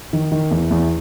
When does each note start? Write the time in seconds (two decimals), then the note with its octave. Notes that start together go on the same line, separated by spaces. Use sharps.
0.13 D#3
0.32 D#3
0.51 E2
0.71 E2